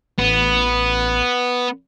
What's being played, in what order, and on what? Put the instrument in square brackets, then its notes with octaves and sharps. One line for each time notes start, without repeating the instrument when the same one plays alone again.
[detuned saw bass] A1 [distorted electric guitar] B3